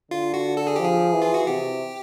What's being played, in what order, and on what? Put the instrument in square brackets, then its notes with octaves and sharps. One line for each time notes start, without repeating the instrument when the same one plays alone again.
[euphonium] D3 [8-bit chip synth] F4
[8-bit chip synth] F#4
A4
G#4
[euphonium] F3 [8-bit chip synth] G4
[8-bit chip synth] G#4
[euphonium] E3
[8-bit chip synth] F4
F#4
[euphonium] C3 [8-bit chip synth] G4